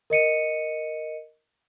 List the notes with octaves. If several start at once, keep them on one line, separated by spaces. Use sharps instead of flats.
A#4 D#5 C#7 D#7